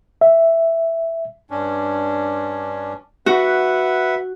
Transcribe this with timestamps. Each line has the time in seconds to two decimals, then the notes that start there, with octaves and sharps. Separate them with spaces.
0.21 E5
1.51 G2 C#4 D4
3.26 F#4 B4 E5 F#5